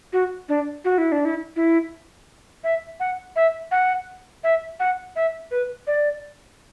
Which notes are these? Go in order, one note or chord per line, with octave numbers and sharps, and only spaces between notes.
F#4
D4
F#4
E4
D4
E4
E4
E5
F#5
E5
F#5
E5
F#5
E5
B4
D5